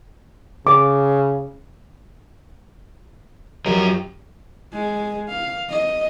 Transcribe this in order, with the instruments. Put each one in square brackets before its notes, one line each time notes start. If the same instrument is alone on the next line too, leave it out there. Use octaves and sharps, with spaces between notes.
[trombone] C#3 [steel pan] D6
[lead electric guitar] F#2 A#4 [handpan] F3 G4 D#5
[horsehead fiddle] G#3
F5
D#5